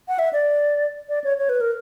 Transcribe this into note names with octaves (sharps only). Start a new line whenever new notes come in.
F#5
E5
D5
D5
C#5
C#5
B4
A#4